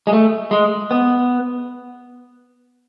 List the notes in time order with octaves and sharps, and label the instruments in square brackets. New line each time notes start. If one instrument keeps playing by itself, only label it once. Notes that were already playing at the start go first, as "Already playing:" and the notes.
[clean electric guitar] G#3
A3
G#3
B3